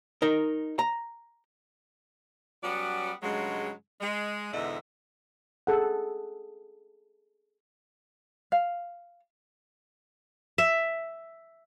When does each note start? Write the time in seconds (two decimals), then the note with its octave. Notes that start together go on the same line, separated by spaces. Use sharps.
0.22 D#4 A#4
0.79 A#5
2.63 F#3 G3 B3 C#4 F#4 D5
3.22 G2 C#3 F#3 G#3
4.00 G#3
4.53 E2 G#2 B2 D3 D#5 E5
5.67 G#4 A4 F#5
8.52 F5
10.58 E5